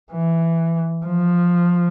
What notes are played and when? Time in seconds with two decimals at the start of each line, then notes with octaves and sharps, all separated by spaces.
0.12 E3
1.06 F3